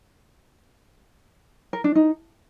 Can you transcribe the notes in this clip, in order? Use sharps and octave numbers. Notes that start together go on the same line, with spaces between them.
A#4
D4
D#4